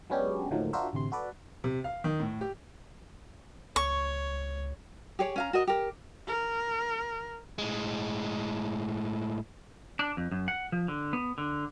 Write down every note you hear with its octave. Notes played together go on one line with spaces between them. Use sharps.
F#3 G#3 B3 C#4 D4 G4
D2 A2 D#3 F3 F#3 A#3
D4 F4 F#4 A#4 C5 E5
A1 D2 C3 C6
F#4 A4 B4 D5
C3
F5
D#3
A2
G4
C#2 C#5 C#6
G4 G#4 C#5
C#4 F5 A#5
F#4 A#4 D#5
G4 A#4
A#4
A2 G#3
D4
F2
F#2
F#5
F3
D3
B3
D3